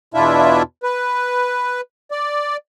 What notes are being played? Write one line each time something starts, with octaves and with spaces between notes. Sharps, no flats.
E2 B2 D4 E4 F4 E5
B4
D5